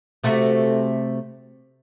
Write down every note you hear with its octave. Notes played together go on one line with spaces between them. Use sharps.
C3 A3 F#4